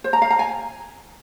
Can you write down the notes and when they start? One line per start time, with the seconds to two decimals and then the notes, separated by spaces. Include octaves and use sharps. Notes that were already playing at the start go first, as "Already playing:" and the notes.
0.04 C5
0.13 A#5
0.22 F5
0.30 A#5
0.39 G#5